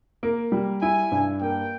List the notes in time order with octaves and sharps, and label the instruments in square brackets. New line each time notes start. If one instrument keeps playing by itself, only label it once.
[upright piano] A#3
G3
[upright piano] E4 [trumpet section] G#5
[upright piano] G2
[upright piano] A#3 [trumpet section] G5